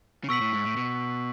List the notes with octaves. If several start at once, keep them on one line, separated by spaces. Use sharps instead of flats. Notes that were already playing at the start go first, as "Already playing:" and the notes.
C#3
B2 C#6 E6 B6 F#7
A2
G#2
A2
B2